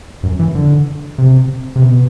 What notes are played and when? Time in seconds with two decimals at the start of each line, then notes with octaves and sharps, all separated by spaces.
0.23 F#2
0.40 E3
0.55 D3
1.18 C3
1.76 C3
1.82 B2